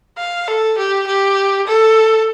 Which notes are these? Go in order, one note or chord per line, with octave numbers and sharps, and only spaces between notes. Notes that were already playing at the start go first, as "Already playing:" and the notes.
F5
A4
G4
G4
A4